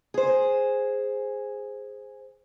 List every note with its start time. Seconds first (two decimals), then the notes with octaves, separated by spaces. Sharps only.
0.14 G#4 C5